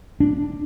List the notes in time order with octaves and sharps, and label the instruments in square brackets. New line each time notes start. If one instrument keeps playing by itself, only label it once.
[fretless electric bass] D4